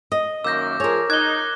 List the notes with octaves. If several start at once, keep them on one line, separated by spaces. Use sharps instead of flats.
D#5
F#2 D#3 A#3 D6 E6 G6 A#6
F3 G#4 A#4 C#5
D#4 F#6 G#6 G7